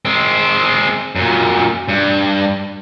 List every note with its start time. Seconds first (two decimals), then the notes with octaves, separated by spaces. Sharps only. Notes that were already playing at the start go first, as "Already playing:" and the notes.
0.05 G#3 C4
1.15 F#2 A#2
1.88 G2